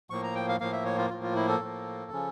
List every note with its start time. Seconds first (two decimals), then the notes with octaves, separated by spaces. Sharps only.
0.10 A2 F3 A#3 C#6
0.23 A#5
0.35 G5
0.49 F5
0.60 A2 F3 A#3 F5
0.72 E5
0.86 C#5
0.98 F4
1.10 A2 F3 A#3 F4
1.23 F4
1.35 E4
1.48 A4
1.60 A2 F3 A#3
2.11 C#3 F3 C#4